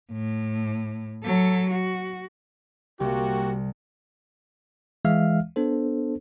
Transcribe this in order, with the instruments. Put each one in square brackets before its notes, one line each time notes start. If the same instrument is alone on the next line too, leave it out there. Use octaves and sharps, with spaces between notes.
[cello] A2
F#3 A4
F#4
[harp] C2 [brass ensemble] A#3 F#4 [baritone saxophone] G4
[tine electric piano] E3 G#3 E5 F5 F6
B3 D4 A4 C5